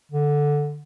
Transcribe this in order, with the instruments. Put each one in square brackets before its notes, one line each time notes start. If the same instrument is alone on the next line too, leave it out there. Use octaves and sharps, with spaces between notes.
[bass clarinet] D3